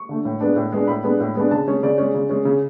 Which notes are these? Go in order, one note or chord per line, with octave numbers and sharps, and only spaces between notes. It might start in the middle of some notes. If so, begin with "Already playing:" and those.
Already playing: C#6
D3 A3
A2
G#3 B3 D4
A2
G#3 B3 D4
A2 B5
G#3 B3 D4
A2
G#3 B3 D4
C#3 A5
G#3 C#4
C#3 D5
G#3 C#4
C#3
G#3 C#4
C#3